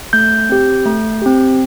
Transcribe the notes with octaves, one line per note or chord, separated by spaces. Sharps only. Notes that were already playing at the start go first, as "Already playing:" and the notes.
A3 G6
C4 G4
A3
C4 G4